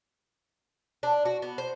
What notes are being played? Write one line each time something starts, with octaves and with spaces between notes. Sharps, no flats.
D4
F#4
B3
C5